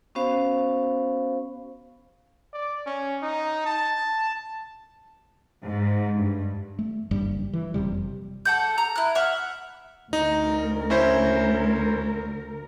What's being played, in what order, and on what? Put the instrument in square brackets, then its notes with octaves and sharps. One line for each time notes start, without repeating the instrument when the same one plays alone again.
[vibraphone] B3 C#4 F#4 C5 F5
[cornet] D5
C#4
D#4
A5
[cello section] G#2
G2
[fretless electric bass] A3
F#1 G2 G3
E3
F#1 F2 C3 G3
[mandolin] A4 F#5 G6
A#5
E4 F#6
E5 F#5 F6
[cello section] D2 A#4 [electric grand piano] D#4
[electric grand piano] C#4 E4 C5